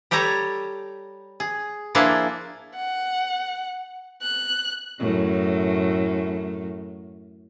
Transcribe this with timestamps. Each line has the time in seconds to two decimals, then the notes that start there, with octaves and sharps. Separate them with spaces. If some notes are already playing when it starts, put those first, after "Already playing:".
0.11 G3 G4 A4 C#5 A#5
1.40 G#4
1.95 F3 A#3 D4 E4 G#4 A5
2.76 F#5
4.22 F#6
5.00 F#2 A2 A3